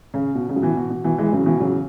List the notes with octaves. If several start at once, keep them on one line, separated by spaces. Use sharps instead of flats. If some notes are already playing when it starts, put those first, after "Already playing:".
C#3
B2
C#3
F#3
B2 E3
B2
B2
B2 E3
E3 G#3
C#3 F#3
B2 E3
C#3 F#3